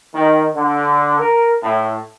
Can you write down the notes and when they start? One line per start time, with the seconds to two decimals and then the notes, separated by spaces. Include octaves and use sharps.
0.14 D#3
0.54 D3
1.19 A#4
1.63 A2